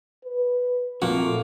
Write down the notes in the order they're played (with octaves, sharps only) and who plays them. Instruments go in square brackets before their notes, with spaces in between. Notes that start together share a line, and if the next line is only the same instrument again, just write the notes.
[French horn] B4
[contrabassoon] F2 [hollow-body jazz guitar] A#2 F3 F#4 [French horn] A3 [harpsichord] A#3